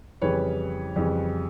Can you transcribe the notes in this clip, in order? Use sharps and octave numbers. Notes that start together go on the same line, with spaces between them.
F2 C#3 E3 G3 B4 C#5
F2 C#3 E3 G3